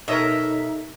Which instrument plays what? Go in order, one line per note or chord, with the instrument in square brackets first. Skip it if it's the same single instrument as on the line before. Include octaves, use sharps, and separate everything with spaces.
[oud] B2 G4 A4 [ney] D#4 [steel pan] A#4 C#5 D#5 [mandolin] E5